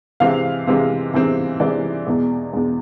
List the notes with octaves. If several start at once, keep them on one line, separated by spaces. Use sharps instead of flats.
C3 E3 G#3 C4 F5
C3 E3 G#3 C4
C3 E3 G#3 C4
C3 E3 G#3 C4 D5
E2 B2 G#3
E2 B2 G#3